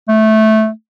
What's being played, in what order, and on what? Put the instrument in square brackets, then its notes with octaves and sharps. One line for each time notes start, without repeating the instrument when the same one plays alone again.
[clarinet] A3